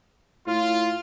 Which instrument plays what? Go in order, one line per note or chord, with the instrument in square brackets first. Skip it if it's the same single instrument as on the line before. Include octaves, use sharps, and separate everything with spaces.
[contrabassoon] A2 [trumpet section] F4